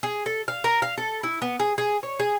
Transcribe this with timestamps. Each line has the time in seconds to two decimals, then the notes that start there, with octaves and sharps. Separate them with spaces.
0.03 G#4
0.26 A4
0.48 F5
0.64 A#4
0.82 F5
0.98 A4
1.23 E4
1.42 B3
1.60 G#4
1.78 G#4
2.03 C#5
2.19 G#4